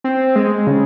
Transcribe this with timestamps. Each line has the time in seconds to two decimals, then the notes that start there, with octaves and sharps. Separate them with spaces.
0.04 C4
0.36 G#3
0.67 C#3